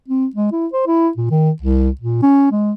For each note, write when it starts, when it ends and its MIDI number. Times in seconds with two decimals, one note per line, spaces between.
0.08 0.26 60
0.35 0.50 56
0.52 0.67 64
0.73 0.82 72
0.87 1.09 64
1.17 1.28 46
1.30 1.51 51
1.61 1.90 36
2.01 2.22 46
2.22 2.50 61
2.52 2.73 56